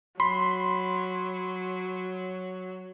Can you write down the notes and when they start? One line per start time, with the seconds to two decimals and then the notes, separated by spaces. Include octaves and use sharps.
0.20 F#3 B5 C6